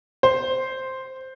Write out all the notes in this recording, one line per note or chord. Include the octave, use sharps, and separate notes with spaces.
C5